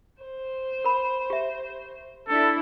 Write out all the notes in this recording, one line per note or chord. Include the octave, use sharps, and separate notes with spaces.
C5
A#4 B5
G4 E5
D4 E4 A4